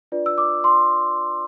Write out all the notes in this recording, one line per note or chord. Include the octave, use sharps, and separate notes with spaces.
D4 F4 B4 D5
E6
D6
C6